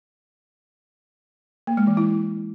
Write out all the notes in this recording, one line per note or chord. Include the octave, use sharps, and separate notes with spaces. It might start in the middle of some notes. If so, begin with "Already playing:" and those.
A#3
G#3
E3
E4